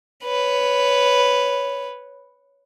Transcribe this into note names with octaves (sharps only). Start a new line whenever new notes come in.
B4 C#5